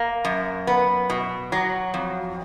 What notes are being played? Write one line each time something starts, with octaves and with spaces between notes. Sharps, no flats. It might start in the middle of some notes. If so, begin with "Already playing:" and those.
Already playing: A#3
F#2
B3
B2
F#3
F2